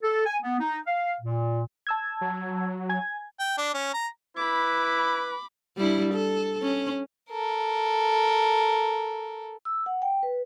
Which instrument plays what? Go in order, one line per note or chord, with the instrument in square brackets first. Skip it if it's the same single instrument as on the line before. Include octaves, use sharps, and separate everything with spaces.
[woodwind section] A4
G#5
B3
D#4
F5
A#2
[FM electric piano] A5 E6 G#6
[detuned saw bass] F#3
[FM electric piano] G#5 G#6
[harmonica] G5
D4
C#4
A#5
[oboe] E4 [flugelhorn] B4 [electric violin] B5 D6
[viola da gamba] G3 D4 E4
A4
C#4
[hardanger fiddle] A4 A#4
[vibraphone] E6
F#5
G5
B4